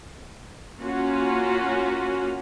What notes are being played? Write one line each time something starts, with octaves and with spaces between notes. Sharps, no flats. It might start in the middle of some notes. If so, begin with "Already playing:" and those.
A#3 C#4 F4 F#4